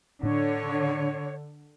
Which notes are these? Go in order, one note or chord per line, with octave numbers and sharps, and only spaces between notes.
A2 D3 D4 C#5